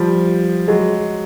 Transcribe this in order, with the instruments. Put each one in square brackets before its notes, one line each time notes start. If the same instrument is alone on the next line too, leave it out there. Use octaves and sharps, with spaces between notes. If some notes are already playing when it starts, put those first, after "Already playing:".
Already playing: [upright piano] F3 G3
F#3 G#3